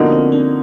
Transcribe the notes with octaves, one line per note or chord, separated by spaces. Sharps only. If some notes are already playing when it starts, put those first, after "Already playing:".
Already playing: D3 F3 A#3 B3 D#4 F#4
C4
D4